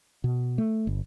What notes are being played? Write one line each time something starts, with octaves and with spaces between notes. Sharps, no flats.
B2
A3
G1